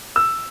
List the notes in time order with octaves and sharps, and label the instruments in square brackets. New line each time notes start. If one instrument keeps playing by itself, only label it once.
[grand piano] E6